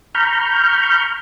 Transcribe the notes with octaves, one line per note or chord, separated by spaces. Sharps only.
A#5 B5 C#6 F6 G6